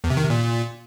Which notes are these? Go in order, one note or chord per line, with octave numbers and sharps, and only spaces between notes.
E2
C3
D#3
C3
A#2